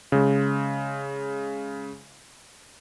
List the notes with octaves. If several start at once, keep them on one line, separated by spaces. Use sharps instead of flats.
C#3 G#3